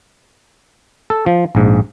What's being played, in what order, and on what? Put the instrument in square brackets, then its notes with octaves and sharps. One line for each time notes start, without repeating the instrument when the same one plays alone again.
[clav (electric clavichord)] A4
F3
A#1 G#2